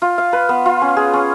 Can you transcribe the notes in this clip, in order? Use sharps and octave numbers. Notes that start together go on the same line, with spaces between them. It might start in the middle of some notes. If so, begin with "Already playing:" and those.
F4
F5
B4
B3
F4
C#4
G#4
C#4